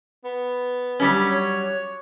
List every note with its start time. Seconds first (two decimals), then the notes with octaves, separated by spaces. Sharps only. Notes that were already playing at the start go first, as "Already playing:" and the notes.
0.25 B3
1.00 F#3 G3 C#4
1.31 C#5